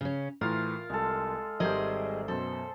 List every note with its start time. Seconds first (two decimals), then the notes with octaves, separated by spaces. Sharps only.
0.01 C#3 C#4
0.41 A2 E3 F4 A#4 F5
0.90 C2 G#3 A4
1.60 G#1 G3 G#4 A#4 C5 D#5 E5
2.28 F#2 B2 A4 C5